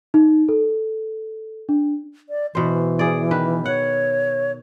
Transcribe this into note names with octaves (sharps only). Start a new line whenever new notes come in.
D#4
A4
D4
D5
B2 E3 C5
G#4 D5
D#3 B4
C#5 F#5